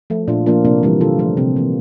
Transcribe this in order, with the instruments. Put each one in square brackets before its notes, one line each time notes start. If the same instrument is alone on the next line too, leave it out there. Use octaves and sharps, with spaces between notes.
[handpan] F3 A3
A#2 D4 F4
F3 A#3 D4 F4
C3 A#3 D4
E3 G3 A#3
D3 F4 A4
F3 A3
C3 C4
E3 A#3